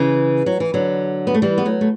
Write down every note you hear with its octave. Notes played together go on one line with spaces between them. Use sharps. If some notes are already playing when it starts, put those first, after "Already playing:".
Already playing: C#3 E3
F#3
E3
D3 F#3
B3
A3
E3 G3
B3
F#3 A3
A3